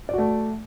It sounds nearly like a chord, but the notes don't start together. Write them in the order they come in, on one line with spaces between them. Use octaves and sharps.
D5 F#4 A3